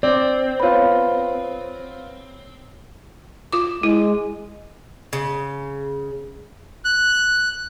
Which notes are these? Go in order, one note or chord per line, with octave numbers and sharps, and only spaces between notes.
C4 D5
B3 F4 C#5 B5
F4 D6
G#3 E4
C#3
F#6